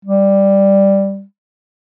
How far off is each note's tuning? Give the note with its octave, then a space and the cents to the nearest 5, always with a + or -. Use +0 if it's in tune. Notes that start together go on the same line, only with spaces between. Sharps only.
G3 +5